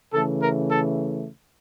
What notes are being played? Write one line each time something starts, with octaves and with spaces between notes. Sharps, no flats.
C#3 E3 A3 A4
A#4
A4